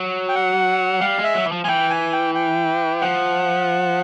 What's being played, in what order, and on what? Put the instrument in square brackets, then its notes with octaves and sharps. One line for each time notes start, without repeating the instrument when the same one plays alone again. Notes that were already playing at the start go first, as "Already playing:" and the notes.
Already playing: [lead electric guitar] F#3
[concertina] G5
F#5
[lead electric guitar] G3 [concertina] F5
[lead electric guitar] G#3
[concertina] E5
[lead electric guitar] F#3
E3
F3
[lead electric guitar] F3 [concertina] G#5
[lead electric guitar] E3 [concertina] G5
[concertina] G#5
G5
G5
[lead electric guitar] F3 [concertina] F#5